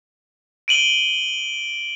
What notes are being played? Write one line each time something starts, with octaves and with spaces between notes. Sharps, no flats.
D7 D#7 F#7 G7